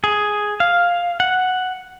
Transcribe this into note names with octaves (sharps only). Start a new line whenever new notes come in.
G#4
F5
F#5